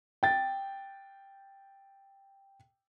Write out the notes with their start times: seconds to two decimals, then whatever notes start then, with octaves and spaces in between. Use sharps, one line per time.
0.23 G5 A6